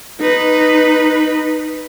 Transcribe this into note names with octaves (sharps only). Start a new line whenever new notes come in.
D#4 B4